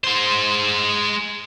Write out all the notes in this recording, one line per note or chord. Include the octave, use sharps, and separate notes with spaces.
G#3 C5